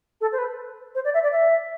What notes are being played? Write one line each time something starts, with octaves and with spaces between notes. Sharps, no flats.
A4
C5
B4
C5
D5
E5
D5
E5